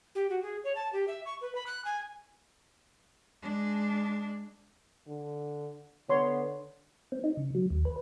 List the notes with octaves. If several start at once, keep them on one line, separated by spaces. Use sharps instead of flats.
G4
F#4
G#4
C#5
A5
G4
E5
C#6
B4
B5
F#6
G#5
G#3 D4
D3
D3 B3 C#5 C6
C4
D#4
C#3
F#3
D#2
B4